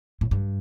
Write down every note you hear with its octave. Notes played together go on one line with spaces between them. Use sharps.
A2
G2